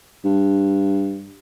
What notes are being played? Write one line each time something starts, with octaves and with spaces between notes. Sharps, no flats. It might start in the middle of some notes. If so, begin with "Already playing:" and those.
G2